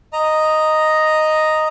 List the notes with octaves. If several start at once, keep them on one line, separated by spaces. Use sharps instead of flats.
D#5 A#5